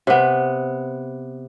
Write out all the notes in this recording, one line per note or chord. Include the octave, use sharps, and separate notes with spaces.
C3 B3